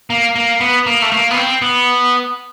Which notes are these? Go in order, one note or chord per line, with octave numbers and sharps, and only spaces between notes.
A#3
A#3
B3
A#3
A3
A#3
B3
C4
B3